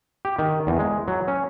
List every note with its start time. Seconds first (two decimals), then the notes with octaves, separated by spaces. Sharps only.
0.25 G4
0.39 D#3
0.67 E2
0.79 G#3
1.08 F#3
1.28 C#4